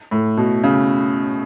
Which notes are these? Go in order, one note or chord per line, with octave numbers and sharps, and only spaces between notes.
A2
B2
C#3